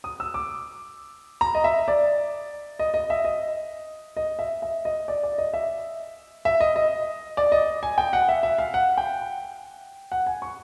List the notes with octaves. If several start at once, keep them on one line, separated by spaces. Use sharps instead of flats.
D#6
E6
D6
A#5
D#5
E5
D5
D#5
D#5
E5
D#5
D#5
E5
E5
D#5
D5
D5
D#5
E5
E5
D#5
D#5
D5
D#5
G#5
G5
F#5
E5
E5
F5
F#5
G5
F#5
G#5
C#6